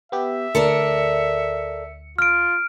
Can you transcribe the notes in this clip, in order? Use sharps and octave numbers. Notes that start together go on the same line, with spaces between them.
B3 G4 E5
D2 A4 A#4 D5 C#7
F4 F6 D7